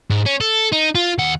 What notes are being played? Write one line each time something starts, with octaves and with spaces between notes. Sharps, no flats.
G#2
C#4
A4
D#4
F4
D#2 F#5